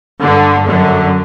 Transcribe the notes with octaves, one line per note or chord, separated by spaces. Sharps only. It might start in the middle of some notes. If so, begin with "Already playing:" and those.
G2 D3
F#2 D3